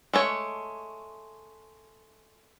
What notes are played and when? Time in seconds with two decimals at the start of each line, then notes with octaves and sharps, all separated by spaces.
0.13 G#3 A3 C#5